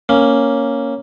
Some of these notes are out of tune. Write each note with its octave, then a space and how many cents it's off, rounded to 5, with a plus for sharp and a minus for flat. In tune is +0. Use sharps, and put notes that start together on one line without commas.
A#3 +0 C#4 +0